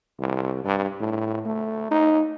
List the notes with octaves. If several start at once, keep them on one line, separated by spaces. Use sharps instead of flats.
C2
G2
A2
A3
D#4